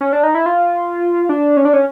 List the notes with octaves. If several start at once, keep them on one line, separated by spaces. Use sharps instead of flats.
C#4
D4
D#4
E4
F4
D4
C#4
D4
C#4